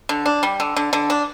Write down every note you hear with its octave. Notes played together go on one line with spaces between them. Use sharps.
D3
D4
G3
D3
D3
D3
D4